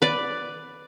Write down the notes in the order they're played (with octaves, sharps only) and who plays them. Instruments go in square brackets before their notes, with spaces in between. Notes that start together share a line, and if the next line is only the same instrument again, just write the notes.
[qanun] B4 D5